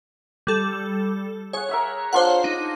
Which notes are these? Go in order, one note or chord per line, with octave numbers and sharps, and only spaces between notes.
G3 A4
G#4 C#5 F#5
A#4 E5 F#5
D4 F4 A#4 C5 C#5 F#5
D#4